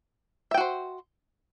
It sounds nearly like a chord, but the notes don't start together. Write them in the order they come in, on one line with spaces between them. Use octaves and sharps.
E5 G5 F#4 C5